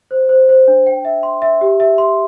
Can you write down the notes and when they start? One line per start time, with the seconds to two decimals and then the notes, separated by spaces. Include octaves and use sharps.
0.11 C5
0.29 C5
0.49 C5
0.68 D4
0.87 G5
1.05 E5
1.23 C6
1.42 E5
1.61 G4
1.80 E5
1.98 C6